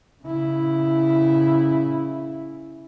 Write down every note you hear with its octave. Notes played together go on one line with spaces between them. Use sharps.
C#3 E4